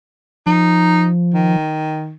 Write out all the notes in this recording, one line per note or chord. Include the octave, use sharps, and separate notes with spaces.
F3 D#4
D#3